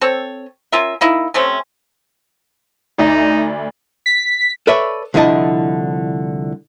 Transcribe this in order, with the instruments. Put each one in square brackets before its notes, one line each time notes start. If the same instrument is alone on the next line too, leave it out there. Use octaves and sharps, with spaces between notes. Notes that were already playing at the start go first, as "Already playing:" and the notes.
[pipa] C4 A4 C#5
C#4 F4 A#4 E5
A#3 D#4 E4
C3 A3 C4 C#4
[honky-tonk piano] D2 D5 E5 [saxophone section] D#4
[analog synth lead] B6
[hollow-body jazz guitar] A4 B4 C#5 D5 E5
C2 D3 F3 E4 D#5 A5